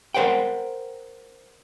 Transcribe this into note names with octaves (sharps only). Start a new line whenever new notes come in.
A#4 C5 F#5 G5